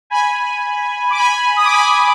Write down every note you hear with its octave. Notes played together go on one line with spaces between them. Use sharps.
G#5 B5
D6
G#5 B5
D#6
D6
G#5 B5